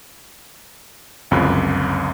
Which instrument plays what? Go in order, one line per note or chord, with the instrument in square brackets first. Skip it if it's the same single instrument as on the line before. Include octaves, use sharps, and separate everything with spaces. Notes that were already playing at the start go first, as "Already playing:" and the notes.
[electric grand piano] G1 C#2 F#2 C4 B5 F#6